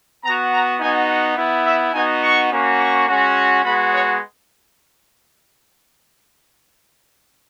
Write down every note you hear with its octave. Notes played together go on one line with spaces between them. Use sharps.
B3 F#4 A#5
A#5
B3 D#4 F#4 G#5
F#5
B3 E4
E5
B3 D#4 F#4 G#5
C#6
A#3 C#4 F#4
C#6
G#3 C#4 F#4
G#3 B3 F#4 B5
C#5